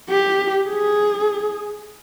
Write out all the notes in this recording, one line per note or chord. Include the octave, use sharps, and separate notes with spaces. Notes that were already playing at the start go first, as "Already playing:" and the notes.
G4
G#4